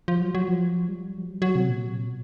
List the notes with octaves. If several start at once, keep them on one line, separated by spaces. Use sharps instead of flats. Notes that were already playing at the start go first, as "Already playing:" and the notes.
F3
F#3
F#3
F3
G3
F3
F#3
F#3
C3
A#2
B2